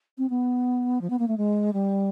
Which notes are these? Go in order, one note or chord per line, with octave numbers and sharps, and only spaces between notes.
C4
B3
F3
B3
A#3
A3
G#3
G3